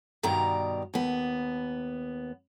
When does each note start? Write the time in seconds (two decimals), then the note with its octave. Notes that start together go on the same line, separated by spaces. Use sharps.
0.23 G2 B2 D#3 D5 A#5
0.94 D#2 B3